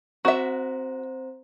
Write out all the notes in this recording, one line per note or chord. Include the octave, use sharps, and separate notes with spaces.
C4 F#4 C5 E5 A#5